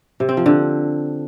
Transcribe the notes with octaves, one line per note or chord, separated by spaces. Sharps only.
C3
C4
F3
D3